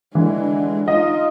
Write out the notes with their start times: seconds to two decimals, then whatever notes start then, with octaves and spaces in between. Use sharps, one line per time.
0.15 D3 E3 G#3 D4
0.88 D#4 F4 D#5